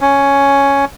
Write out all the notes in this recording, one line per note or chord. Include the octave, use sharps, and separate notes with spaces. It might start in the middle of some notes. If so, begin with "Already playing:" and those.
C#4